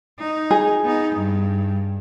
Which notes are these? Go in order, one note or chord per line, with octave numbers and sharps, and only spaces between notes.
D#4
G#4
B3 D#4
G2